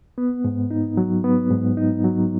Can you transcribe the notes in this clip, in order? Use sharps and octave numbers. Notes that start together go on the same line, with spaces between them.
B3
G#2
D#4
F#3
B3
G#2
D#4
F#3